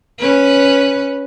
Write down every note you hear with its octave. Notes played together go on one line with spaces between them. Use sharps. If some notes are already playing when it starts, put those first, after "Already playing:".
C#4 B4